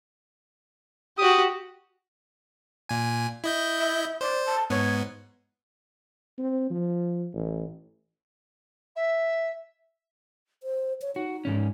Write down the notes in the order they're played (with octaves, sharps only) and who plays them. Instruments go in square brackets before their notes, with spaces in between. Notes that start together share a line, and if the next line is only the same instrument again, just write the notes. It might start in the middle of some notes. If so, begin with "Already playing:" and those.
[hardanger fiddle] F#4 G4 [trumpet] D#6
[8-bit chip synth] A#2 G#5
E4 D#5 G6
[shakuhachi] E5
[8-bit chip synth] C5 [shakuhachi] D5
[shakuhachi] A5
[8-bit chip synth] G#2 B3 [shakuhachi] C#5
[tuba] C4
F3
A1
[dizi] E5
[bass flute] C5
C#5
[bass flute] D#4 [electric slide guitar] F#4
[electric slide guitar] G#2 B2 C#4